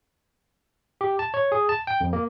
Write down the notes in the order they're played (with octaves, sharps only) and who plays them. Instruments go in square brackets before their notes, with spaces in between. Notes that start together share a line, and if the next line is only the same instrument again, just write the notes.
[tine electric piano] G4
A5
C#5
G#4
A5
G5
F2
A#3